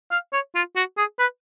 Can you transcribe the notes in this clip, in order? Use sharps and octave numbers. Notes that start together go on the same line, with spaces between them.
F5
C#5
F4
F#4
G#4
B4